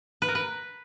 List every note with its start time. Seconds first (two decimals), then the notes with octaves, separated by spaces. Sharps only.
0.22 B4
0.28 A#4
0.35 B4